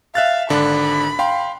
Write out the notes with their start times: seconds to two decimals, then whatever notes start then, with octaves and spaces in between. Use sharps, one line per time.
0.15 E5 F5 F#6 A6
0.50 G#1 D3 D4 B5
1.19 F5 G5 C6